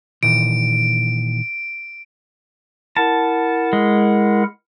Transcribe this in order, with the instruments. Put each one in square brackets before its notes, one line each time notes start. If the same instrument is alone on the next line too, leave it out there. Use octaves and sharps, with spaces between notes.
[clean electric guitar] A#2 D#3 E3 [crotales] D7
[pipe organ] E4 A#4 F#5 [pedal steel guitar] A5
[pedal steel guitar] G#3